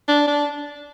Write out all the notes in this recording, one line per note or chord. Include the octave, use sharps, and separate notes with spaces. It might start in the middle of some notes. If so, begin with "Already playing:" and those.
D4
D4